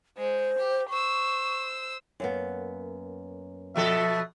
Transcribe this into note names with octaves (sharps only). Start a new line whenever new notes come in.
G#3 C5
G4
C5 C#6 E6
F#2 A#3 B3
B2 F3 A4 E5